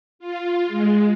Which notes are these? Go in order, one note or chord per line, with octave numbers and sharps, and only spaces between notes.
F4
G#3